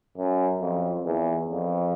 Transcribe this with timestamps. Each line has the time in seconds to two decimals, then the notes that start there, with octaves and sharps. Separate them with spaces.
0.18 F#2
0.61 F2
1.05 E2
1.50 F2